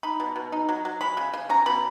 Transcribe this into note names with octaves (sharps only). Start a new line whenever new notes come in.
D#4 B5
B2
B2
D#4
F#3
F#3
G#3 B5
C#3
C#3
C#4 A#5
B2 B5